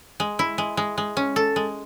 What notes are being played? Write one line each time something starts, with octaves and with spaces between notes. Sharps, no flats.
G#3
E4
G#3
G#3
G#3
C#4
A4
G#3